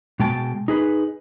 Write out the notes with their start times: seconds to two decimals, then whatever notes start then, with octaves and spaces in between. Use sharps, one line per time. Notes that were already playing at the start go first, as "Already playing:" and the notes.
0.20 B2 G#3 G5 A5
0.68 D#4 G#4 B4